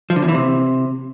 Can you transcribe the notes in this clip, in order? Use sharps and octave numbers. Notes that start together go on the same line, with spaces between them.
F3
D3
E2
E3
C3